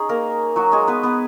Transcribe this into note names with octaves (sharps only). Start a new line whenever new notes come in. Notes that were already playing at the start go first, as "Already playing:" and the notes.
Already playing: C#4 D#4 G#4
A#3 A#4
F#3 F#4
G#3 G#4
B3 B4
B3 B4